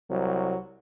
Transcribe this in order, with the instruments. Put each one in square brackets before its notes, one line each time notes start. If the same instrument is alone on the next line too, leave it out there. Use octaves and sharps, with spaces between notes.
[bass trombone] C2 [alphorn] F#3